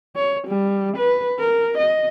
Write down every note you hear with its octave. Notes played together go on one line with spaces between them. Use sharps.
C#5
G3
B4
A#4
D#5